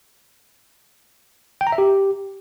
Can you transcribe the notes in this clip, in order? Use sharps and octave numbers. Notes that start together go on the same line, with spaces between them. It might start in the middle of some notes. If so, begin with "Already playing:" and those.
G5
A#5
E5
G4